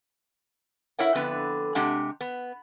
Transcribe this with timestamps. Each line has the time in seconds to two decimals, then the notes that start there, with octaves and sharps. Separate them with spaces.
0.99 E4 A#4 C#5 F#5 G5
1.15 F2 D3 B3 B4
1.75 C3 G#3 D4 G4 F#5
2.21 B3